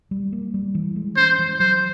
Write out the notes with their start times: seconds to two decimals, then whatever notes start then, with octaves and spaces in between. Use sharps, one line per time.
0.11 G3
0.32 A#3
0.54 G3
0.75 E3
0.96 G#3
1.17 C#4 C5
1.39 E3
1.59 F#3 C5